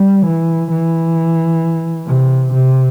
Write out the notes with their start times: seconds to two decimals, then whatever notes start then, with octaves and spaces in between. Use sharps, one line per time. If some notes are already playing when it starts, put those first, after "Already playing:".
Already playing: G3
0.25 E3
0.71 E3
2.07 C3
2.53 C3